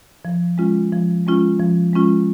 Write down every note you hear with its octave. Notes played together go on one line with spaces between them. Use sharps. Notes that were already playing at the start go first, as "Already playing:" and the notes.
F3
G#3 C#4 F4
F3
G#3 C#4 F4
F3
G#3 C#4 F4